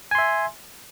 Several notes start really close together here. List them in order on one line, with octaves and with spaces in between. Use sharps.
G#5 C6 E5